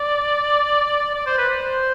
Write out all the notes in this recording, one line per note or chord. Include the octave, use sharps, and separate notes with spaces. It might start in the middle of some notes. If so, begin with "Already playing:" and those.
Already playing: D5
D5
C5
B4
C5